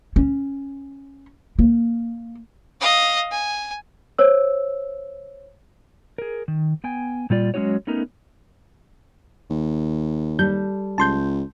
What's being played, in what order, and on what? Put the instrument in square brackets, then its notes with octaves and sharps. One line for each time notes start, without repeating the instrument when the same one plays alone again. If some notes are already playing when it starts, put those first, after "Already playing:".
[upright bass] C#4
A#3
[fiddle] D#5 F5
G#5
[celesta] C5 C#5 E6
[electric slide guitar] G#4 A#4
D#3
B3 G5 G#5
A#2 G3 F4 D5
F#3 G#3 C#4 D#4 F#4 C#5
A3 B3 C#4 D#4 A#4
[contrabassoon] D#2
[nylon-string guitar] G3 A4 [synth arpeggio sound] G6
[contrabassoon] C#2 [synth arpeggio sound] A5 C6 G6